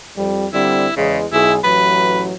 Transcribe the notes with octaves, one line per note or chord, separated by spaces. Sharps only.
F2 G3
D3 G3 C4 E4
E2 C#3 G#3
B1 E4 G#4
A1 E3 F#3 B4